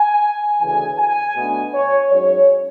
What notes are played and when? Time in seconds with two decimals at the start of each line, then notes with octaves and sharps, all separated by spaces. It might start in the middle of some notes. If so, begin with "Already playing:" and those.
Already playing: G#5
0.60 D2 C#3 E3 G#5
0.98 G#5
1.35 B2 A3 D4
1.73 C#5
2.11 G#2 F#3 C#4 C#5